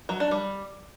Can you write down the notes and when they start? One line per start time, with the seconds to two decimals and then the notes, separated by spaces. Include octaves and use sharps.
0.09 F#3
0.20 D4
0.31 G3